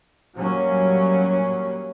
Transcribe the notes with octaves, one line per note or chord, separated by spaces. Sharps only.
F#3 G3 A#3 C#4